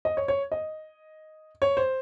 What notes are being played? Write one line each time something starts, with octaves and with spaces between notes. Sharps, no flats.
D#5
C#5
C#5
D#5
C#5
C5